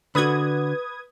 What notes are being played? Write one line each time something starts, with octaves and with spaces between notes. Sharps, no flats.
D3 F#4 B4 D#6 G#6